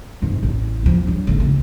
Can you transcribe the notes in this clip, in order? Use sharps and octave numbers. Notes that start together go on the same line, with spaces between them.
F2 G#2
A1
E2 F3
F#3 D4
G#1 D3
C#2 A3